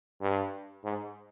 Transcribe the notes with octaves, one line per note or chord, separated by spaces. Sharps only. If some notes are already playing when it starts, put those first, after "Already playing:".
G2
G#2